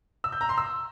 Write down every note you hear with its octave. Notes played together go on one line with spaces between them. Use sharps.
E6
G6
A#5
C6
E6